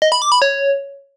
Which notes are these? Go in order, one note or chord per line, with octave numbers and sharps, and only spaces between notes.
D#5
B5
D6
B5
C#5